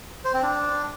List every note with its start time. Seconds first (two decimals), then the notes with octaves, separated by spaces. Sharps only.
0.25 C5
0.34 C4
0.43 D4